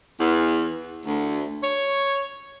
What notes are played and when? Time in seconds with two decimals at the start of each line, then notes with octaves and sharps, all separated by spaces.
0.20 E2
1.06 D2
1.63 C#5